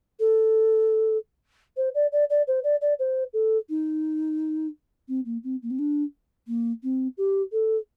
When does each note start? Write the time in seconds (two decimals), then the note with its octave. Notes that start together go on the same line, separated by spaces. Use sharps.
0.19 A4
1.77 C5
1.94 D5
2.12 D5
2.30 D5
2.47 C5
2.63 D5
2.81 D5
2.99 C5
3.33 A4
3.69 D#4
5.08 C4
5.25 A#3
5.43 C4
5.62 A#3
5.70 C4
5.78 D4
6.47 A#3
6.83 C4
7.17 G4
7.52 A4